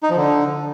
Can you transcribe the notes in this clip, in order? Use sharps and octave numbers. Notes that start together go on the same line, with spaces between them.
D#4
F3
D3